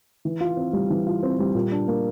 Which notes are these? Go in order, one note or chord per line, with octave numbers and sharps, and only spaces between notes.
E3
F4
C4
G3
E3
F4
C4
G3
A#2
D4
A#3